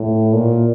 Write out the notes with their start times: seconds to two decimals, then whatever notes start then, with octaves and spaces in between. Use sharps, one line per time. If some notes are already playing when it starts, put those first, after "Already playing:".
Already playing: A2
0.33 A#2